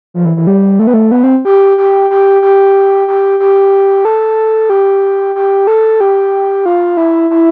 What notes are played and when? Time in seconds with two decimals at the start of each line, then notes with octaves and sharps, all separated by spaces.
0.14 F3
0.25 E3
0.37 E3
0.47 G3
0.79 A3
0.87 B3
0.94 A3
1.12 B3
1.23 C4
1.45 G4
1.78 G4
2.10 G4
2.42 G4
3.08 G4
3.40 G4
4.05 A4
4.70 G4
5.35 G4
5.67 A4
6.00 G4
6.66 F4
6.97 E4
7.30 E4